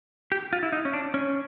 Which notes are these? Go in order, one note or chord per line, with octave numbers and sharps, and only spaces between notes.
G4
F4
E4
D#4
C#4
D4
C#4